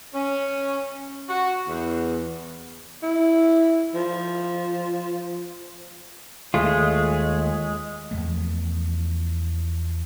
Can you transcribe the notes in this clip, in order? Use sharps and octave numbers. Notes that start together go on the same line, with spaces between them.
C#4
F#4
E2
E4
F3
D#2 G#3 A3 F4
E2 F3 A3